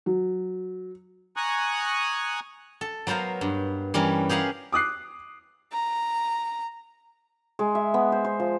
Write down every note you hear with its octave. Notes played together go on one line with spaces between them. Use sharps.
F#3
G#5 A#5 C#6 D#6 F#6
A4
F#3 B3 A#4 C5 F5
G2
E3 G3 C#4 A#4
G4 G#4 A#4 F5 F#5
D6 D#6 F#6 C7
A#5
G#3
E5
B3
C5
C5
F3